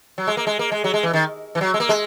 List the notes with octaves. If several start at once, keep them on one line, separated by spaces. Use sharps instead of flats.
F#3
G#3
A#3
G#3
A#3
G#3
F#3
G#3
E3
D#3
E3
F#3
G#3
A#3
G#3